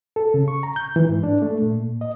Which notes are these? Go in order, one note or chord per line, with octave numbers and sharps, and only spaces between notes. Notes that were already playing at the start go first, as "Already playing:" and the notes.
A4
C#3
C#6
A#5
G6
E3
G#2
D4
A3
A#2
D#5